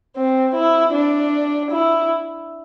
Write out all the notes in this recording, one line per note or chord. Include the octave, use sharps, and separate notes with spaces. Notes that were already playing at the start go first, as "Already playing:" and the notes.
C4
E4
D4
E4